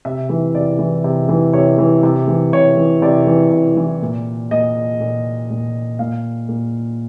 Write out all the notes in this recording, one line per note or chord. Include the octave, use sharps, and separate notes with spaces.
C3 E5
E3
C3 D5
E3
C3
E3
C3 C#5
E3
C3
E3
C3 C#5
E3
C3 D5
E3
C3
E3
A#2
A#2 D#5
A#2
A#2
A#2 F5
A#2